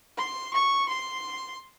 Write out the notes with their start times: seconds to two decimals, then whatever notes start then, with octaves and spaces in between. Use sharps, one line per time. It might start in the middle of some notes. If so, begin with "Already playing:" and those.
0.18 C6
0.53 C#6
0.89 C6